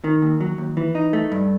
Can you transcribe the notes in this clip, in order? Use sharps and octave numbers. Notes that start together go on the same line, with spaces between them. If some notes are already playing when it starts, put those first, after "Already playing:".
D#3
D#2
F#3
D#2
E3
D#4
A3
G2